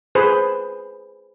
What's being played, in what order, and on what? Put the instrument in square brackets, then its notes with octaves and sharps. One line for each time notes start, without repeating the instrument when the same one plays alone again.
[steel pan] G#4 B4 C5